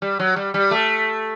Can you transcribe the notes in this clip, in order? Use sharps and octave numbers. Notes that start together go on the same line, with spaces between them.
G3
F#3
G3
G3
A3